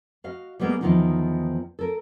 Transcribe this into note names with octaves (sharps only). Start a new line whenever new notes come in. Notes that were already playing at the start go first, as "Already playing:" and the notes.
F#4 D#5 F5
G3 G#3 A#3 B3
E2 A2 D#3 F3 B3 D#4
A4 A#4